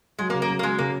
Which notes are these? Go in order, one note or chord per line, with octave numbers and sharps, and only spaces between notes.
F#3 G#3
A#3
C#3
A#3
F#3
A#3
F#3 G#3
C#3 A#3